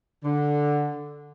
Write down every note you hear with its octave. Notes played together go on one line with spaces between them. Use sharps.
D3